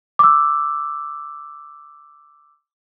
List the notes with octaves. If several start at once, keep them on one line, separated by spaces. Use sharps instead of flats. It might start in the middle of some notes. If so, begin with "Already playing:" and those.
D6 E6